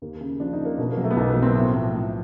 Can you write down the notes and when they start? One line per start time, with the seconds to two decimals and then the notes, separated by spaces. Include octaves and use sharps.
0.02 D#2 A#3
0.21 C#3
0.40 F3 D4
0.53 D#4
0.59 C#3
0.65 A#3
0.78 B2
0.92 A#3
0.97 F#3
1.04 A3
1.11 B3
1.17 B1 A#3
1.30 B3
1.36 F#3
1.42 C4
1.55 A2
1.74 F3
1.94 A2